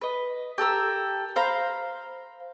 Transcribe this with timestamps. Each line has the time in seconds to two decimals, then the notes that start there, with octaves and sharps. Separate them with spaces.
0.01 B4 D#5
0.58 G4 A4 A#4 E6
1.36 C5 F5 A#5 B5